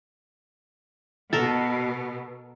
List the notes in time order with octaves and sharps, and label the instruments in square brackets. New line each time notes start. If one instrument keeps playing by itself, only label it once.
[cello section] B2 [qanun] A4 A#4